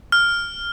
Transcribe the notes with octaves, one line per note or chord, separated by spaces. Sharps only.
F6